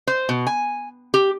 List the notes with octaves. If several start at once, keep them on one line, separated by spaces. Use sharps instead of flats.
C5
B2
G#5
G4